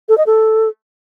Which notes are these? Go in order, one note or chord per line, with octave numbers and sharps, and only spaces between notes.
A4
D#5
A4